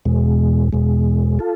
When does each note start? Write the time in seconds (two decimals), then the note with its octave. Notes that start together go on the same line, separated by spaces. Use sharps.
0.05 E2 B2 G#3
0.73 E2 B2 G#3
1.39 F4 A4